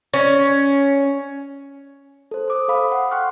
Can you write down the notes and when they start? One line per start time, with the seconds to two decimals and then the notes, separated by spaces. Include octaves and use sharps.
0.14 C#4
2.31 A4 C5
2.48 C5 D6 D#6
2.68 A4 F5 B5 D#6
2.89 F5 F#5
3.11 F#5 G5 C6 C#6 F6 F#6